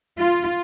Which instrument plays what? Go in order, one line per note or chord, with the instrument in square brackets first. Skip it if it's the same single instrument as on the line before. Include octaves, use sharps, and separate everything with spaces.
[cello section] F4